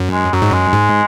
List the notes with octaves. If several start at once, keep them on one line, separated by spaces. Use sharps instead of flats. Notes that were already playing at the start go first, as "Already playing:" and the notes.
Already playing: F#2
G#3
F#2 F#3
G#2
F#2 G#3
G#2